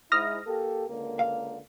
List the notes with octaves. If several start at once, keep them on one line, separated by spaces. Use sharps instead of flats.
G#2 E4 D#6 F6 A#6
A#3 G4 A4
C#2 D3 A#3
F5